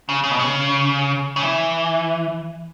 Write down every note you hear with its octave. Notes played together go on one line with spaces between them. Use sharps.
C#3
C#3
B2
C#3
C#3
E3